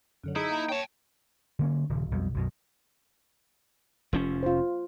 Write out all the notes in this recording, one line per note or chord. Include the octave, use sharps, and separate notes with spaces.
F#2 D3 F#3
D#4 E4 G#4 A4
A#3 A#5
C#5 G5 A5
D3 A#3 C#4
D#1 C#3
B1 F2 B2 G3
B1 F#2 B2
F1 F3 C#4
F4 C5